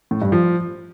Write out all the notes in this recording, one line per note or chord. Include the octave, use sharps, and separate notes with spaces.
A2
G2
F3